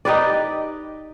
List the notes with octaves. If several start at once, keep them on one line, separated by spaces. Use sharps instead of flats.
D#4 G4 B4 D5